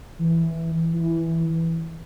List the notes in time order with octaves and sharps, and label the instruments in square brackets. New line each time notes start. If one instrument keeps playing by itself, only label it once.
[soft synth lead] E3
E3